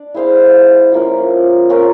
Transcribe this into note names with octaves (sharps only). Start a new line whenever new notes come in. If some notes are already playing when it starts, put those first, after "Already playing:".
Already playing: D4 D5
E4 G#4 C5 F5
F3 A#3 C#4
A#3 C#4 F4 A#4